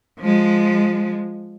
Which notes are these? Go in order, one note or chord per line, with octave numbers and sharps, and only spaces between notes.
F3 G#3